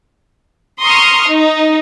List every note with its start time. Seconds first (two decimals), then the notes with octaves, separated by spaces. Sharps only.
0.81 A#5 C6 C#6 D#6 F6
1.26 D#4